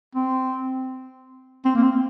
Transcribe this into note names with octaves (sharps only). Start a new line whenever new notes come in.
C4
C4
A#3
C4